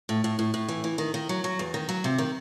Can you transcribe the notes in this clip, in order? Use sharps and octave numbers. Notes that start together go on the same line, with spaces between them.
A2
A2
A2
A2
E3
E3
D#3
D#3
F#3
F#3
E2
D#3
F#3
C3
D#3